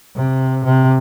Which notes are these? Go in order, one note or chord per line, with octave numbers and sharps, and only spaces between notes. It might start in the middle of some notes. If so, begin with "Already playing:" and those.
C3
C3